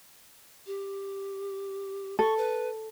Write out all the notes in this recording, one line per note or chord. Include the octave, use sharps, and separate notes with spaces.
G4
A4 C#6
B4